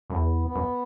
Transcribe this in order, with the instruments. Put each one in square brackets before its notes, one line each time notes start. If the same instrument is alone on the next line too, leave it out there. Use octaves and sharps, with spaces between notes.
[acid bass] F#2
[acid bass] E2 [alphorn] B3
[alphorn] B3
[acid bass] F#2